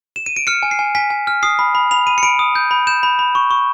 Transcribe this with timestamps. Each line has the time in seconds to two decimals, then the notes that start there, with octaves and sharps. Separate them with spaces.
0.16 E7
0.26 D#7
0.36 D7
0.47 F6 C#7
0.63 G#5
0.71 C7
0.79 G#5
0.95 G#5 B6
1.10 G#5
1.27 F6
1.43 D#6 C7
1.59 B5
1.75 B5
1.91 B5 F7
2.07 B5 D#7
2.18 C#7
2.23 B5 D7
2.39 D#6
2.55 G6
2.71 B5
2.87 G6 E7
3.03 B5
3.19 B5
3.35 C#6
3.51 C#6